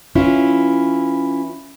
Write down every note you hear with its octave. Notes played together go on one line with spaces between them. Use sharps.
E3 C#4 E4 F4